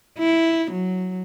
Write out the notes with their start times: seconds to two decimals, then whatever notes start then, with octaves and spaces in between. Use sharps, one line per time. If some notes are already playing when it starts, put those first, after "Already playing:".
0.18 E4
0.72 F#3